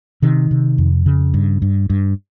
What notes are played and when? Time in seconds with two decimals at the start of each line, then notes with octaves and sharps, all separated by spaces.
0.22 C3 D#3
0.51 C3
0.78 F2
1.06 C#3
1.34 G2
1.62 G2
1.90 G2